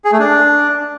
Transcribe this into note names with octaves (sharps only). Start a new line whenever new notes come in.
G#4
A3
D4